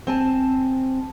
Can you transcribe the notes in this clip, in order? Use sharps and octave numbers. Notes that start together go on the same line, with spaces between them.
C4 G#5 A5